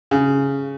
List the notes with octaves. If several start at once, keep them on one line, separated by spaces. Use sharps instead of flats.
C#3